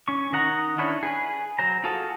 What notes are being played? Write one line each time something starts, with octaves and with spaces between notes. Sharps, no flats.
C#4 C#6
D#3 D#5 F#5 A#5
C#4 D4 E4 B4 C#5
G#4 B4
F#3 C5 A#5
F4 F#4 G#4 A4